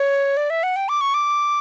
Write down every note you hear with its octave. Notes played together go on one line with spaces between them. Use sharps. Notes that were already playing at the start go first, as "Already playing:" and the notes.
Already playing: C#5
D5
E5
F#5
G5
D6
C#6
D6